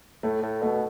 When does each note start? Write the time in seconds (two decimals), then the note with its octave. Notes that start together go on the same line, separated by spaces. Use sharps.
0.23 A2 A3
0.42 A2
0.62 B2 A3